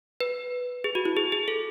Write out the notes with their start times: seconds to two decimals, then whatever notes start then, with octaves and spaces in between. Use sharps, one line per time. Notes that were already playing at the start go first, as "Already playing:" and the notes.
0.20 B4
0.84 G#4
0.95 F#4
1.05 E4
1.17 G#4
1.32 G#4
1.48 A4